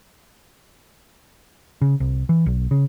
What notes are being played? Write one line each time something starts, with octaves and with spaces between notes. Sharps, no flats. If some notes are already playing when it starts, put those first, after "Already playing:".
C#3
C2
E3
B1
C#3